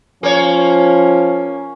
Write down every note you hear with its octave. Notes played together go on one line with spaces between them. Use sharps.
F3 A#3 C#4 C#5